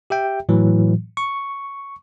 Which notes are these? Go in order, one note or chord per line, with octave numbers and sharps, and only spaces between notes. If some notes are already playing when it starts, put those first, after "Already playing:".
G4 E5 G5
A2 E3 F#3
C#6